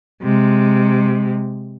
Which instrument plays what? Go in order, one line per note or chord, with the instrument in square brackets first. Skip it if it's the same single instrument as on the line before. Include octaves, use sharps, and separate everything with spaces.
[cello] C3 G#3